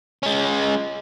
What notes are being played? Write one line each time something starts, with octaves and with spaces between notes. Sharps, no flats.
G#3 C#4